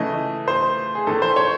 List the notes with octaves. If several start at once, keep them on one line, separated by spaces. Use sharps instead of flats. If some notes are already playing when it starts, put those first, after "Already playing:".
Already playing: C#3 E3 A3 D#5
C5
G#4
A2 E3 A3 A4
C5
C#5